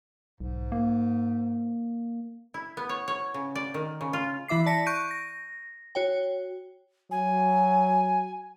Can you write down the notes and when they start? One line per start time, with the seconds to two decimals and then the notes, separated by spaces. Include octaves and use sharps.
0.40 B1 G#2
0.72 A#3
2.54 E4
2.77 B3
2.89 C#5
3.08 C#5
3.34 C#3
3.55 D5
3.74 D#3
4.01 C#3
4.13 F4
4.48 E3 E4 E5 D6 C7
4.66 D5 A5 A#6 B6 C#7
4.86 C#6 F#6 G6 D7 D#7
5.11 A#6
5.95 F#4 C#5 G5
7.11 F#3 G#5